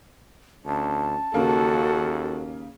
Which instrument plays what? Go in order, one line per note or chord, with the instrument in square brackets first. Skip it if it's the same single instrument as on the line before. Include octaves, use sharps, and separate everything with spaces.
[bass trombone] D2 [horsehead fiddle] C#4 [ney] A5
[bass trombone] D#2 [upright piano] C#3 A#3 [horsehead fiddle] F#4 A4